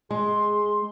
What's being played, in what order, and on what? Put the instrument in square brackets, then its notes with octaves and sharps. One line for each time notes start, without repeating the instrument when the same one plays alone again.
[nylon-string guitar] G#3 [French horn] G#4 [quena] C6